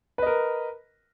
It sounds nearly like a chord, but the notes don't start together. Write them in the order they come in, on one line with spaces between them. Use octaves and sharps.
B4 D#5 A#4